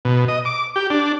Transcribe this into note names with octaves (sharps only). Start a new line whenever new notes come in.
B2
D#5
D6
G4
D4